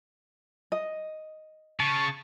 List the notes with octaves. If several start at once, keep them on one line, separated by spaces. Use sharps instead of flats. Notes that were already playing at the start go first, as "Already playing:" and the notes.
D#5
C#3 A5 C#6